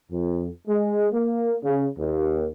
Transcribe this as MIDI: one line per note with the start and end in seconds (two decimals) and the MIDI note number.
0.12 0.49 41
0.68 1.09 56
1.13 1.57 58
1.64 1.86 49
1.98 2.47 39